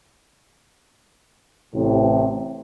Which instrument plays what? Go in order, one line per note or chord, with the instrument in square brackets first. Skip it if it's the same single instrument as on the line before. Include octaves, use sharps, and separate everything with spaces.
[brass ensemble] A1 A2 C3